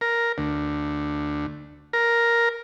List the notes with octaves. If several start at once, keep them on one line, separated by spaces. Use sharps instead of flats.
A#4
D2
A#4